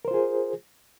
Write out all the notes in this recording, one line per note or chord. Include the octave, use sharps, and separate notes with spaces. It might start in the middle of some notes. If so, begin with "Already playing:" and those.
F4 G#4 A#4 C5